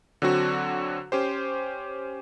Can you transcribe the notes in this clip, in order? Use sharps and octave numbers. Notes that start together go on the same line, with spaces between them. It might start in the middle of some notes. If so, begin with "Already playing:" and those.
D3 F#3 C4 F#4
C#4 G4 C5